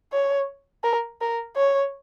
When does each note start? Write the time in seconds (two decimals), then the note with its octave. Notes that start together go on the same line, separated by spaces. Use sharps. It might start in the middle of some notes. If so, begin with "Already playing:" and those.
0.12 C#5
0.84 A#4
1.21 A#4
1.56 C#5